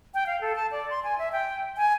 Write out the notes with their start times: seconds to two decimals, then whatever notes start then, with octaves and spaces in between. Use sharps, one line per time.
0.14 G5
0.27 F5
0.41 A4
0.55 A5
0.71 D5
0.90 C6
1.04 G#5
1.18 E5
1.32 G5
1.77 G#5